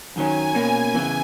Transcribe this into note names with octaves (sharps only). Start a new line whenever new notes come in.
F#2 D#3 F#3 C#4 G#5
B2 A#3 C#4
E2 C#3 E3